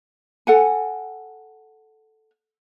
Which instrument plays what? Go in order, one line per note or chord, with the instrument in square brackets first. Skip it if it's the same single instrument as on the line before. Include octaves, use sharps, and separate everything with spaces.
[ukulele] A4 F#5 G#5